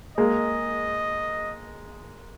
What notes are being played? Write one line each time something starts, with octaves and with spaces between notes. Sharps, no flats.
G#3 A#3 D#5